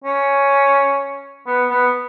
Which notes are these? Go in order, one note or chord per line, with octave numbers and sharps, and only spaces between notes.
C#4
B3
B3